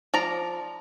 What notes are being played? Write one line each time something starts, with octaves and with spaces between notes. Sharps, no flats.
F3 D5 A#5